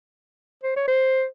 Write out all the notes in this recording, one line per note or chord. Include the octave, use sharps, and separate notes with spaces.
C5
C#5
C5